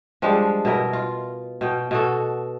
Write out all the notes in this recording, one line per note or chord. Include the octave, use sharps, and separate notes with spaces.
F3 G3 G#3 D4
B2 E4 A#4 D#5
F4
B2 G5
B2 F#4 A4